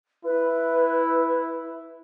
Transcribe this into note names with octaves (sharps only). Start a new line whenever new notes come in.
E4 B4